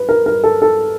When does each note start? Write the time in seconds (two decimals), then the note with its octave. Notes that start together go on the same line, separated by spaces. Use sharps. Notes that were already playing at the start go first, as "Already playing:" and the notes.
Already playing: B4
0.09 A#4
0.26 A#4
0.44 A4
0.62 A4